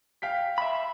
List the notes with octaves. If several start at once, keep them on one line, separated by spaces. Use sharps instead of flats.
F5 G5 B6
E5 B5